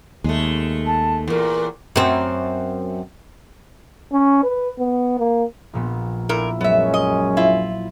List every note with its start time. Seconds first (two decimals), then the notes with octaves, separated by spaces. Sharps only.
0.24 D#2 G#3 A3
0.85 A5
1.28 E2 A#2 A#4
1.96 F#2 C4
4.13 C#4
4.43 B4
4.79 B3
5.19 A#3
5.73 A#1 A#2 B3
6.29 A#2 E4 A#4
6.61 F#2 F#3 G#3 B3 C#4 E5
6.94 D#5
7.37 E4 F4